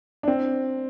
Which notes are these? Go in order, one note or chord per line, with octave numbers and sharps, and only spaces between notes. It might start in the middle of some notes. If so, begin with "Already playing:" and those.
D4
C4